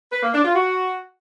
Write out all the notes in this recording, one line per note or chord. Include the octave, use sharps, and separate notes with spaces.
B4
A#3
D4
F4
F#4